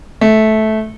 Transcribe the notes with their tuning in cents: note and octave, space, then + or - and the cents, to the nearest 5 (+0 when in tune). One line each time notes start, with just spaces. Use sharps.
A3 -15